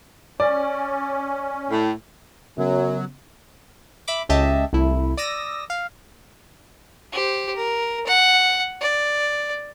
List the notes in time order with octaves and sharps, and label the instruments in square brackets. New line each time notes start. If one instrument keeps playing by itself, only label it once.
[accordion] C#4 [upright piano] D5
[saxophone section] A2
[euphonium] F#2 [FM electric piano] C#3 B3 [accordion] F#3
[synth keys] E5 B5 D6
C#2 C#3 G4 D#5 E5 A5
C2 A3 E4
D5 D#6 E6 A#6
F5
[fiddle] G4 C5
A#4
F#5
D5